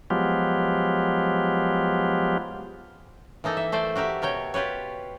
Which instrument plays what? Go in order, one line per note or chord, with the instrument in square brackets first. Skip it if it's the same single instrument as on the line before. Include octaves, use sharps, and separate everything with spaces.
[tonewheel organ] F3 F#3 G#3 B3 F4 G4
[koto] E3 A#3 D#4 A4
E5
A3 C5 D5
F#4 G4 A#4 E5
B2 A#4 C#5 G5
F4 G4 B4 C#5